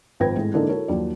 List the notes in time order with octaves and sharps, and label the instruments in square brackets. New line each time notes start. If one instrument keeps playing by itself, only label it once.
[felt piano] G#1 F3 B4 G5 G#6 A#6
G#1 A2 G#3
D3 E3 G#3 A#3 D4 D#4
E4 F#4 A4 A#4 C#5
D#2 F3 F#3 D5